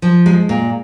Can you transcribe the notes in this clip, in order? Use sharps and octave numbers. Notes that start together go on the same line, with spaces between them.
F3
G#3
A#2